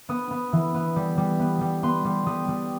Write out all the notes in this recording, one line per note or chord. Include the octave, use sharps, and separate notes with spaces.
B3 D#6
B3
E3
B3
G3
G3
B3
G3
B3 C6
G3
G3 D#6
G3